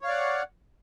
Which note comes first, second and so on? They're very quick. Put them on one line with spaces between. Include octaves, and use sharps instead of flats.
C#5 F5 D5 F#5